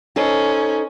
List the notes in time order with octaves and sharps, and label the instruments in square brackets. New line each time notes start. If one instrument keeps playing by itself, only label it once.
[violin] C#4 [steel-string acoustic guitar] D#4 A4 C5